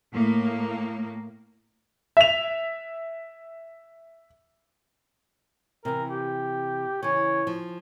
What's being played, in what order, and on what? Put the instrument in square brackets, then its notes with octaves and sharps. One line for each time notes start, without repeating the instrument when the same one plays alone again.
[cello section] A2 A#3
[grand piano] E5 F7
[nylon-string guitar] C3 E3 [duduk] A#4
[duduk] G4
[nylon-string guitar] C#3 E3 [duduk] C#5
[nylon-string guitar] F3